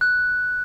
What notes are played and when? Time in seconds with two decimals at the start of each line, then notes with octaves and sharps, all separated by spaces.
0.01 F#6